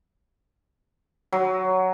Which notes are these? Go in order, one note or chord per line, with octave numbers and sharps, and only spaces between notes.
F#3